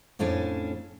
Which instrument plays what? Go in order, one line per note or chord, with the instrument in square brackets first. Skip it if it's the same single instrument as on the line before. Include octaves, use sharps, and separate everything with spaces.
[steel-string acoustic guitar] F2 A2 C#4 D4 A4 G#5